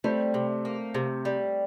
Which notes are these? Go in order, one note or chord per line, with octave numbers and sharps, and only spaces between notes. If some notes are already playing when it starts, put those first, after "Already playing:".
G3 A3 C4
C3
A#3
C3
G3